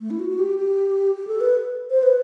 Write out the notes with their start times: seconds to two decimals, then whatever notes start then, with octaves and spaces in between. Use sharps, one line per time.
0.01 A3
0.11 E4
0.20 F#4
0.30 F#4
0.39 G4
0.58 G4
1.15 G4
1.27 A4
1.41 B4
1.90 C5
2.03 B4